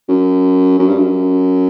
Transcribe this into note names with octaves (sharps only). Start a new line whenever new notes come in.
F#2
F#2
G2
F#2